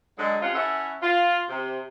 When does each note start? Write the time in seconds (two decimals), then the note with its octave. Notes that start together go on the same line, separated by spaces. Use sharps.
0.18 D3 F#3 G#3
0.42 C3 C#4 F4 F#5
0.55 C#4 E4 A4 E5 F#5
1.03 F4
1.49 C3